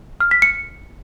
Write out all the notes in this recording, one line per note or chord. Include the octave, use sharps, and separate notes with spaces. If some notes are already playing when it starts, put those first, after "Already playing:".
F6
B6
C#7